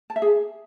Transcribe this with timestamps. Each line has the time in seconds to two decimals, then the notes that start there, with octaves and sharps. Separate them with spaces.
0.10 A5
0.16 E5
0.22 G#4